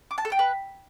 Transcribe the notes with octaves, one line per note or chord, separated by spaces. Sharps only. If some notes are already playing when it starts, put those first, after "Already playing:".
D6
A5
A4
G5
B4